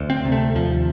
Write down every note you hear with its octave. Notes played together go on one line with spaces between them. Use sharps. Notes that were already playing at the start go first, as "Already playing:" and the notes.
Already playing: D2
C4
C3
A3
D#2 F3